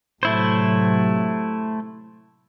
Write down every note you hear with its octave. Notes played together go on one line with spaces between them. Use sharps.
A2 C3 F#3 A3 E4 C5